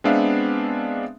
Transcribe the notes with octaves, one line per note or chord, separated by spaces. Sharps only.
G#3 B3 C4 D4 E5 F5